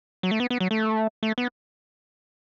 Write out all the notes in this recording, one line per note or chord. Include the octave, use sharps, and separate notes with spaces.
F#3
A3
B3
B3
F#3
A3
A3
B3